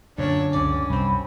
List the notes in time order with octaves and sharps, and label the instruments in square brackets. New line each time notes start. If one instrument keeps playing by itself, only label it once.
[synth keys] F#2 A#2 C#4 [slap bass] D3 [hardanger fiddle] D4 C#5
[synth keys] C#2 F#2 D5 [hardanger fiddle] C#4 [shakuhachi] D6
[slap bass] C2 [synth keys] F#2 C4 [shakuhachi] B5